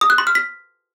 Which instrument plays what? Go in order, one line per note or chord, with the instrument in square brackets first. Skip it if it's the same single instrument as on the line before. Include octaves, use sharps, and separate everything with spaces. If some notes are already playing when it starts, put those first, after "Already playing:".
[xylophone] D#6
F#6
C6
F6
B6